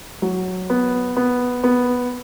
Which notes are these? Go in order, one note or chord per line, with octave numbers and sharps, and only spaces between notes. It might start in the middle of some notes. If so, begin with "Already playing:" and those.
F#3
B3
B3
B3